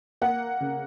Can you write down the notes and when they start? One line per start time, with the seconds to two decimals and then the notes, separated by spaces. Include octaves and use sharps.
0.22 A#3 F#5
0.61 C#3